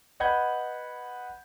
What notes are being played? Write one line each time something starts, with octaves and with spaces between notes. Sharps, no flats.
B4 D#5 F#5 B5 G6 G#6